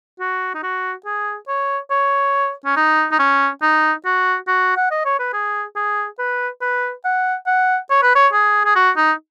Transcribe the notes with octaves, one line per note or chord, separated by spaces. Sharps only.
F#4
D#4
F#4
G#4
C#5
C#5
C#4
D#4
D#4
C#4
D#4
F#4
F#4
F#5
D#5
C#5
B4
G#4
G#4
B4
B4
F#5
F#5
C#5
B4
C#5
G#4
G#4
F#4
D#4